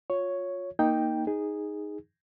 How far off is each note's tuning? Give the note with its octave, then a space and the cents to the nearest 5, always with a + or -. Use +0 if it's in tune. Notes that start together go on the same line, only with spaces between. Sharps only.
F4 +30 C#5 +0
A#3 +0 D#4 +0 G5 +0
D#4 +0 G#4 -10